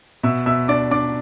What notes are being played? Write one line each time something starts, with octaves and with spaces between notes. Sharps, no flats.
B2 E5 E6
B2 E5 E6
D4 D5 D6
D4 D5 D6